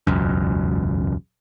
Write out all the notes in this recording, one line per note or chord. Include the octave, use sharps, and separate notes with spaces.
E1 C#2 F#2